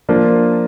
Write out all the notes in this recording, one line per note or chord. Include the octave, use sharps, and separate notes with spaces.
F3 A#3 D4 F4